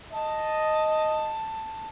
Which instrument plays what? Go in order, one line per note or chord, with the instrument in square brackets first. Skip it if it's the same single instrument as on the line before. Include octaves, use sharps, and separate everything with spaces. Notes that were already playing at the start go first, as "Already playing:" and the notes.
[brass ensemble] D#5 [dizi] A5